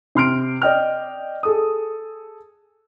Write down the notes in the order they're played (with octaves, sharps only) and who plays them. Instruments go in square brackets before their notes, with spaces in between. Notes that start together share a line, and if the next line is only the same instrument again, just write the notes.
[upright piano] C3 C6 F6 D7
D5 D#5 G5 F6
G#4 A4 D#6